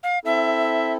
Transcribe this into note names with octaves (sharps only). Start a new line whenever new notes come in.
F5
C4 E4 A4 E5